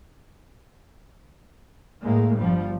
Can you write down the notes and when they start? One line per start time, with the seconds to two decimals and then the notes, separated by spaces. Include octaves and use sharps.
2.03 A2 G#3 A#3
2.37 G1 F3 G3